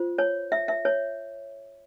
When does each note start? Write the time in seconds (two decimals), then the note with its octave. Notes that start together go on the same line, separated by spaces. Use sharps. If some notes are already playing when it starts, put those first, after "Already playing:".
Already playing: F4 C5
0.18 C#5
0.52 E5
0.68 E5
0.85 C#5